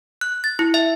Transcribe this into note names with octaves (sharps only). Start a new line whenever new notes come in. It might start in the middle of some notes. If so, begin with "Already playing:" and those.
F#6
A6
E4
E5